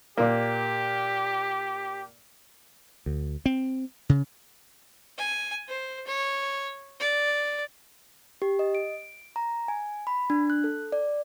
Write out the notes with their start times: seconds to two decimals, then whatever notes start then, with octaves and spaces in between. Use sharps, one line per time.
0.18 A#2 A#3 G4
3.06 D2
3.46 C4
4.09 C#3
5.18 G#5
5.69 C5
6.07 C#5
7.00 D5
8.42 G4
8.59 D#5
8.75 D7
9.36 A#5
9.68 G#5
10.07 B5
10.30 D4
10.50 F#6
10.64 A4
10.92 D5